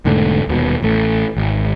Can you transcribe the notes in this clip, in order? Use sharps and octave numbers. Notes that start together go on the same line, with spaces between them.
E1 G#2 D3 A3
D#1 D#2 B2
A1 A3
G#1